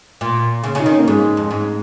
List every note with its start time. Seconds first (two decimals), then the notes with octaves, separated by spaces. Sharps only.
0.21 A#2
0.64 C#3
0.75 C#3 D#4
0.86 D#3 C#4
0.98 A#3
1.08 G#2 G#3
1.37 F2
1.51 G#2